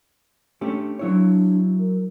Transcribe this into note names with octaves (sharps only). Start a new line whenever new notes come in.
A3 C#4 D4 G4
F#3 D4 E4 C#5
A#4